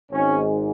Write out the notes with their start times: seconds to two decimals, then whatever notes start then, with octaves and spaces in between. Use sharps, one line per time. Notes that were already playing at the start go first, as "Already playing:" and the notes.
0.11 G#1 G#2 G#3 C#4